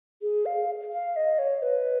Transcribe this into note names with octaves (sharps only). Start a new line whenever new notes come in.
G#4
F5
F5
D#5
C#5
B4